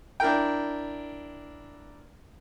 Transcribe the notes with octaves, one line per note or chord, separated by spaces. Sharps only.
D4 E4 A#4 G5